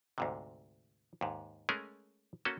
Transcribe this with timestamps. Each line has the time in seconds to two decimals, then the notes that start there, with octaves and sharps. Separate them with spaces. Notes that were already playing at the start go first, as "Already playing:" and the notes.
0.18 D2 G#2 C3
1.21 D#2 G#2
1.69 G#3 A3 C#4 G#4 A#4
2.45 A#3 C#4 F#4 A4